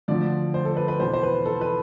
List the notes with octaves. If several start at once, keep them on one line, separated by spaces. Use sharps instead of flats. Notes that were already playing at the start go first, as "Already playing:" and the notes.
D2 D3 F3 D5
C5
A4
B4
B4
E2 B2 C5
C5
B4
A4
B4